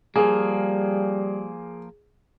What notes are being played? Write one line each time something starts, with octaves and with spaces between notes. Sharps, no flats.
F3 G3 A#3 G#4